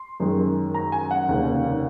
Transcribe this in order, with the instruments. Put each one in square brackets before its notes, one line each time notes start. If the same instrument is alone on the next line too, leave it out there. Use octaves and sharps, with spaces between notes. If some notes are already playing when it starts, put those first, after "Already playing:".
Already playing: [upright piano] C6
F#2 D#3 G#3
A#5
G#5
F#5
F1 D#2 C#3 G#3